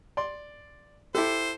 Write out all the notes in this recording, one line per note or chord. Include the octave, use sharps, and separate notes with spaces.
D5 C6
E4 G4 A4 C5